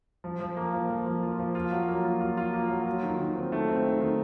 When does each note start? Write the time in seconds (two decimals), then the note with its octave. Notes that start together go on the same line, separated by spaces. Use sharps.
0.24 F3
0.40 F3
0.57 A#3
0.74 F3
0.90 F3
1.06 F3
1.23 F4
1.39 F3
1.55 F4
1.72 F#3
1.88 A#3
2.04 F4
2.21 F4
2.37 F4
2.53 A#3
2.70 F#3
2.86 F4
3.03 D#3
3.20 D#3
3.36 C4
3.52 A3
3.68 C4
3.85 D#3
4.02 D#3